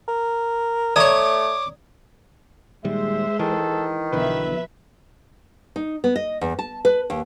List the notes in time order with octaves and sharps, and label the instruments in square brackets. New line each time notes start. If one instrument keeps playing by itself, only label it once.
[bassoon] A#4
[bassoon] A3 [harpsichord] C#5 D#6 [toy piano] D5 A#5 [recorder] D6
[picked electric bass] A#2 D#3 G3 [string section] G#3 C5 [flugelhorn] E5
[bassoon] D#3 [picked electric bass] E3 [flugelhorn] A4
[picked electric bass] B1 D3 E3 [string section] B2 F3 E5 [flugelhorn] B4
[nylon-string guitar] D#4
B3
D#5
E2
A5
B4
D#2